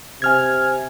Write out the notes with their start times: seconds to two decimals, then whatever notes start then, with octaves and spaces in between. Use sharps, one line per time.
0.22 C3 G#5 F6 G#6